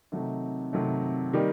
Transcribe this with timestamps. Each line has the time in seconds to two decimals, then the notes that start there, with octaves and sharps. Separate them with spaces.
0.12 C3 D#3 F#3 A3 D#4
0.73 C3 D#3 F#3 A3 D#4
1.33 D#3 G3 A#3 D#4 G4